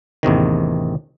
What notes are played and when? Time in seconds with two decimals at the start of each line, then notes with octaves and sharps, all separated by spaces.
0.23 A1 E2 C3 D#3